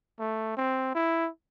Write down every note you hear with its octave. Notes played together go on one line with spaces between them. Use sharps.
A3
C4
E4